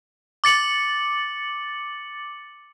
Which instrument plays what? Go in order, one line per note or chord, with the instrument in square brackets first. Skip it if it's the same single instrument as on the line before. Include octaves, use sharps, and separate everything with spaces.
[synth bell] D6 A6 C#7 F#7